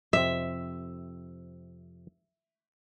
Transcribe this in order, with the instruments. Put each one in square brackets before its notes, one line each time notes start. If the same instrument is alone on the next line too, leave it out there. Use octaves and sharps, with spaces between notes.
[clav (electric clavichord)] F2 C3 C4 [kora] E5